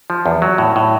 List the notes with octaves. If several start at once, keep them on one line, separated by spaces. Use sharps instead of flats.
F3
E2
F#3
A2
A2